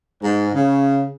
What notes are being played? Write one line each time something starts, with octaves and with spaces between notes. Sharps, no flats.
G#2
C#3